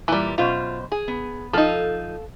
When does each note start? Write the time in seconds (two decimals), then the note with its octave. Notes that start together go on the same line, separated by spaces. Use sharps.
0.08 A#2 E3 G3
0.38 F#2 B2 F4 C5
0.92 G#4
1.08 B3
1.53 F3 D#4 A4 F5